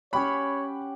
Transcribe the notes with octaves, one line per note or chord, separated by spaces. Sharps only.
C#4 G4 C#5 F#5 B5